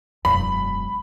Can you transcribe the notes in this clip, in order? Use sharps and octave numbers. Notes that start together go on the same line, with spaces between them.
E1 F#2 B5